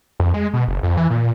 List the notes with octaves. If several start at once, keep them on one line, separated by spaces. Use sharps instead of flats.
F2
G#3
B2
F#1
F2
E3
A#2